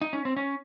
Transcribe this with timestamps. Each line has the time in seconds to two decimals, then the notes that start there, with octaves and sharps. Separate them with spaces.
0.01 D#4
0.13 C#4
0.25 C4
0.37 C#4